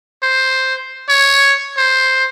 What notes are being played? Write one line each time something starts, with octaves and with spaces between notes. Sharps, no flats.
C5
C#5
C5